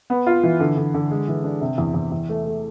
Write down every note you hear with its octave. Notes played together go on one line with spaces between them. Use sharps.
B3
F4
E3
D3
D3
D3
G#3
E3
D4
C3
E2
E2
E2
A3
A3